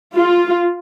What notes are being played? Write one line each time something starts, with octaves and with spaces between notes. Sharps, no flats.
F4